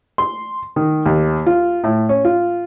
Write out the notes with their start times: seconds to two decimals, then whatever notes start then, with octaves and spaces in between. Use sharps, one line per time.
0.18 C6
0.76 D#3
1.06 D#2
1.46 F4
1.84 A2
2.09 C#4
2.25 F4